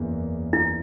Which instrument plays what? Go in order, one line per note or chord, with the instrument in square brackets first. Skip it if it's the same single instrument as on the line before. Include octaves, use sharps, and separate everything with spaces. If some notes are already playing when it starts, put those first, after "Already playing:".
Already playing: [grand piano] F#1 E2 C#3 E3 A#3
[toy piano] E4